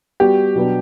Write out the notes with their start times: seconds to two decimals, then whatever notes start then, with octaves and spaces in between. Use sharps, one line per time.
0.20 G3 B3 F#4 G4
0.55 B2 F#3 B3 D4